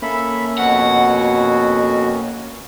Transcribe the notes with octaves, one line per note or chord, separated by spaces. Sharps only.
A#3 C#4 A4 E5 B5
F2 B2 F#4 F#5